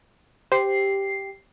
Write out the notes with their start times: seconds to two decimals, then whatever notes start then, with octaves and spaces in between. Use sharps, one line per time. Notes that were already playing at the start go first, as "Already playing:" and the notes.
0.52 G4 C5 C7